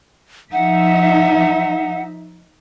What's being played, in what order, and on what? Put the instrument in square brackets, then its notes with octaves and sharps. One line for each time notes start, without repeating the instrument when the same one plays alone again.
[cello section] F3 D#4 E5 [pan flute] F#5